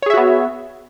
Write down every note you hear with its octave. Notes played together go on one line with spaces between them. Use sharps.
B3 F#4 G#4 C#5 E5